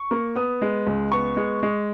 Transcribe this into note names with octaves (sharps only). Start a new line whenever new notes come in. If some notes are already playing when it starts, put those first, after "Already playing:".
Already playing: C#6
A#3
B3 D#6
G#3
C#2
B3 C#6
G#3
G#3